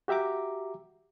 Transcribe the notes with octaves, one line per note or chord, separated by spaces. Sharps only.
F#4 G4 E5 A#5 D6